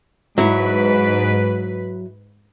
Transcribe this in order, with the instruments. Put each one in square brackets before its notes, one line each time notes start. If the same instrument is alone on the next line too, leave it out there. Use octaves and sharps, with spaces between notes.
[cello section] G#2 B4 [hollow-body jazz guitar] F#3 E4